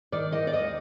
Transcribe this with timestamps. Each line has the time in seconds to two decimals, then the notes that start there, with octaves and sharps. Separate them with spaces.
0.12 D#3 D5
0.32 D#3 D#5
0.47 D5
0.53 D#2 D#5